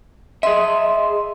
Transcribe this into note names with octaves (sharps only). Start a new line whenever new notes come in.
G#4 D#5 E5 C6